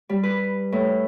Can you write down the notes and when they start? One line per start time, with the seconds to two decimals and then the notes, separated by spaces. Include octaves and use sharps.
0.09 G3
0.23 B4
0.72 A2